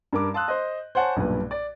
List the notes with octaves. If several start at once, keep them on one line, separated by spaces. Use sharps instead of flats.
G2 A#4 D6
F5 A5 C6 D#6 E6 F#6
C5 D#5
C5 C#5 F#5 G#5 A5
B1 G2 A#2 B4
D5